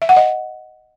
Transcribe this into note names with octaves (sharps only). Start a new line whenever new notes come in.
E5
F#5
D#5